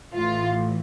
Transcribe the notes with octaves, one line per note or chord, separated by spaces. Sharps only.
A1 A2 E3 F4